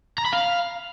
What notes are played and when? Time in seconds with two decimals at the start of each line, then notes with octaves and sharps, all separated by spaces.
0.18 A#5
0.25 B5
0.33 F5